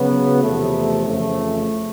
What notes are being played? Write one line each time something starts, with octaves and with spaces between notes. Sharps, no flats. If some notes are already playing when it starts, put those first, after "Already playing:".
Already playing: C#3 F#3 B3
E2 C3 F3 A3
F2 C#3 E3 A3